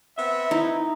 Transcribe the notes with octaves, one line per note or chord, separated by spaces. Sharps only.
B3 C4 E5
D#4 E4